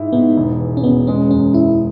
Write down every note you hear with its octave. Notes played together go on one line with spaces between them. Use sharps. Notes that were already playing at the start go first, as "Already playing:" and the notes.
Already playing: G#2 E4
G#2 B3
E1
E3
C#4
E1 B3
G#3 C#4
F#2 C#4
F#2 E4